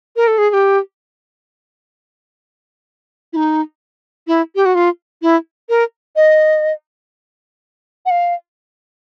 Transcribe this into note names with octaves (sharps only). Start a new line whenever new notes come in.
A#4
A4
G#4
G#4
G4
E4
D#4
E4
G4
F#4
F4
E4
A#4
D#5
F#5
F5